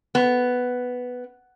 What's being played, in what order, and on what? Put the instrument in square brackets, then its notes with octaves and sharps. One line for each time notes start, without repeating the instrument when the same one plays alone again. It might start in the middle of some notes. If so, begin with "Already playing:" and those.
[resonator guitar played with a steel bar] B3